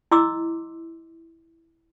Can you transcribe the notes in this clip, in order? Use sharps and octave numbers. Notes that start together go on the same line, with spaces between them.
E4 D#5 C6 D6 E6